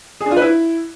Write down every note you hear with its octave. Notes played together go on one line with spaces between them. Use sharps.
G#4
D4
F4
B4
E4